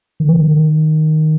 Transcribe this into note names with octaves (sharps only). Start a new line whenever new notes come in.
D#3
E3
D#3
D#3